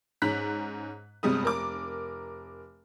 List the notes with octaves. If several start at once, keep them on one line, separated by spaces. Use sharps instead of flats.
G#2 C#4 A#5 F#6 B6
G1 C3 G3 G#3 D#6
F1 A#4 D6